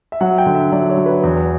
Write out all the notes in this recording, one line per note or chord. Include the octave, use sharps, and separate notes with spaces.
E5
F#3 F#5
G5
D3
E5
F#3 D5
C#5
F#3
B4
E2